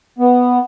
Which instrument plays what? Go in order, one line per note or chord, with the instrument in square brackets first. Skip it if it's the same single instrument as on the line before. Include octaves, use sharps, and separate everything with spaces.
[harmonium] B3